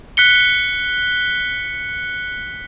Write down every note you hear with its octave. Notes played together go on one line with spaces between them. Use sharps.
F#6 B6 C#7 G7